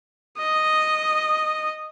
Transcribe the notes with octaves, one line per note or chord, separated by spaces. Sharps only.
D#5